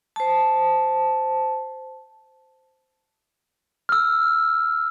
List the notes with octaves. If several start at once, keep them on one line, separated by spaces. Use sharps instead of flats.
C5 A5
E6 F6